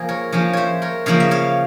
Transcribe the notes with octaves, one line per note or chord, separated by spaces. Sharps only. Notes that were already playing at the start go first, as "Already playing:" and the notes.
Already playing: F3 A#3 G#4
A#4 C#5
F3 A#3 C#4 C#5 F5
C5 C#5 E5
A#4 C#5
C#3 F3 A#3 C#5 F5
E5
C#5 F5